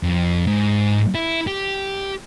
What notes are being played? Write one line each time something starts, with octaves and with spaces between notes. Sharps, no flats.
F2
G#2
E4
G4